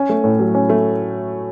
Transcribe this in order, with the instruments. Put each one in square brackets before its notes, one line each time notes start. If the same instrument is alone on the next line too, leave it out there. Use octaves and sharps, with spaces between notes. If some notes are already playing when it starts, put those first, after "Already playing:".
Already playing: [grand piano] C#4
A3
A2
F#3
C#4
A3